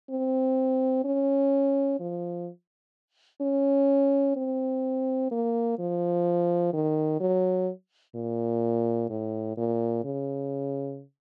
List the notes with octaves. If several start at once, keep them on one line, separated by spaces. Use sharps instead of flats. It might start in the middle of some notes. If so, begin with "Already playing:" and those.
C4
C#4
F3
C#4
C4
A#3
F3
D#3
F#3
A#2
A2
A#2
C#3